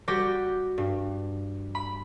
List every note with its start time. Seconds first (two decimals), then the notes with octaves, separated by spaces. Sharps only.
0.08 G3 F#4 G4 A#6
0.78 G2
1.75 B5